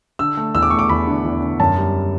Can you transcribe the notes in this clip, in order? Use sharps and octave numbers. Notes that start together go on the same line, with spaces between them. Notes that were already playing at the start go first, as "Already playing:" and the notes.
D3 E6
A3
E2 E6
D6
A3 C#6
D6
E2 B5
D3
E2
D3
F#2 A5
G3